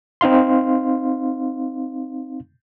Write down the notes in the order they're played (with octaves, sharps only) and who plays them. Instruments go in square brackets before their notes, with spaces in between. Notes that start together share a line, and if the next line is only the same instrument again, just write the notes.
[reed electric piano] C4 D#4 F5 C6